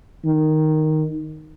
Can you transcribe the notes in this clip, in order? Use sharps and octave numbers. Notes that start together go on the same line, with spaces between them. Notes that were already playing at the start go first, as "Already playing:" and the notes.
D#3